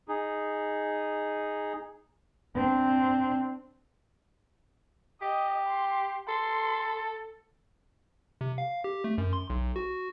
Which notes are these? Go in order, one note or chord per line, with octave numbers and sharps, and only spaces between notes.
D#4 G#4
C4 D4
G4 D#5
C6
A4 C6
C3
F5
G4
A3
F#2
C6
B1
F#4